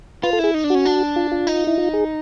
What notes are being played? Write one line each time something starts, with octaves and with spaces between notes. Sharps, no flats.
F4 B4
A4
E4 G#4
D#4
D4
C#4 F#4
D4
F4
F4
D#4
E4
F4
G#4